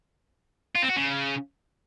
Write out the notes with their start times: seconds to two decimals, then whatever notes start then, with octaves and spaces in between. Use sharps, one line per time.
0.76 F4
0.83 C4
0.90 F#4
0.97 C#3